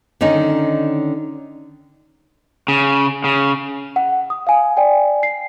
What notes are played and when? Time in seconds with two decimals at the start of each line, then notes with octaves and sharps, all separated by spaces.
0.21 D3 D#3 C#4 D#4
2.68 C#3
3.24 C#3
3.96 F#5
4.30 D#6
4.47 F5 G#5
4.77 D5 G5 G#5
5.23 C7